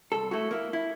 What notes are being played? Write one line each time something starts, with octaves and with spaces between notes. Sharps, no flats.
C2 A4
A3 E4 F#4
A#3 E4
E4